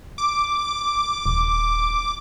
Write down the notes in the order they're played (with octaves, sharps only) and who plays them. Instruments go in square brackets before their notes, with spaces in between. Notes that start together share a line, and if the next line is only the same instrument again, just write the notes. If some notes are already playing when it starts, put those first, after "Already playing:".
[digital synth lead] D6
[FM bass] D#1